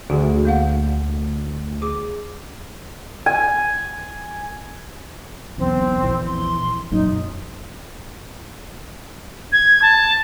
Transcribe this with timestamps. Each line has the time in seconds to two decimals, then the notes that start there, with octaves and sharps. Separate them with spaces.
0.10 D2 F#4 G#4
0.45 A#3 F5 F#5
1.82 G#4 D6
3.26 G#5
5.58 B1 E2 C4
6.01 A#1 E2 E3
6.26 C6
6.91 E1 F#2 A#2 D#4
9.52 G#6
9.82 A5